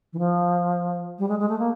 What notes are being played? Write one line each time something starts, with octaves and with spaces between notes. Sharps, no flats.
E3
F3
G3
G#3
G#3
A3
A#3